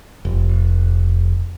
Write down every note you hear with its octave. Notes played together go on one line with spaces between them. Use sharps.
F1